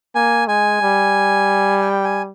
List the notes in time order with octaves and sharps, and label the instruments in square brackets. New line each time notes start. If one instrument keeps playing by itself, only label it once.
[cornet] A#3 [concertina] G#5
[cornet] G#3 [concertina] G#5
[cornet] G3
[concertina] G5
G#5